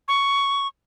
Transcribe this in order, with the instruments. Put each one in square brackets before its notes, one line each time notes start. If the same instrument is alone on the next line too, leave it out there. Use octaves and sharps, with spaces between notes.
[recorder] C#6